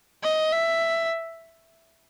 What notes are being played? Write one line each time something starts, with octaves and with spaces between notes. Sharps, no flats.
D#5
E5